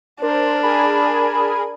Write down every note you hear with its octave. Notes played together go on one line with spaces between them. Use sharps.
D4 A#4 C5
G#4 A#4 G#5 B5